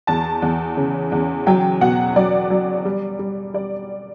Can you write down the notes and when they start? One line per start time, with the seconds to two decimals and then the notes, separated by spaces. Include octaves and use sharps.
0.07 E2 A5
0.42 E2
0.77 C#3
1.12 E2
1.47 F#3 G5
1.81 B2 F#5
2.16 F#3 D5
2.50 F#3
2.85 G3
3.19 G3
3.54 G3 D5